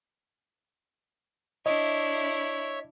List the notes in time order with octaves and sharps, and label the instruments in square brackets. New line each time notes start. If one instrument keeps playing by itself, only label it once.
[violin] D4 E4 [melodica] C#5 E5 [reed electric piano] D#5